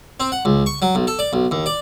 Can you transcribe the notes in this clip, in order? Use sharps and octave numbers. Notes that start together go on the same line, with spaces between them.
C4
F#5
C#2
C#6
F#3
B1
A4
D5
B1
D#2
D5